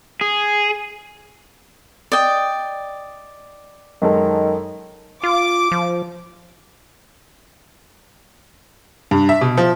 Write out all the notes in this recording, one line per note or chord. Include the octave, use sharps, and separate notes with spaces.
G#4
D5 D#5 G5
F#2 D#3 G#3 A4
F4 D6
F3
G2
E5
B2
F3